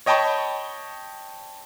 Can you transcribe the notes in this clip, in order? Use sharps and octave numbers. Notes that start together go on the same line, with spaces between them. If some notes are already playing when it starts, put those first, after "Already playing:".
C#5 D#5 G5 A5 B5 C#6